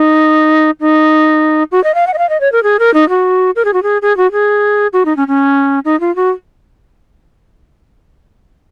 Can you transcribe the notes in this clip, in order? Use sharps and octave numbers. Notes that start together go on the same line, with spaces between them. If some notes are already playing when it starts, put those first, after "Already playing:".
Already playing: D#4
D#4
F#4
D#5
F5
F#5
D#5
F5
D#5
C#5
A#4
G#4
A#4
D#4
F#4
A#4
G#4
F#4
G#4
G#4
F#4
G#4
F#4
D#4
C#4
C#4
D#4
F4
F#4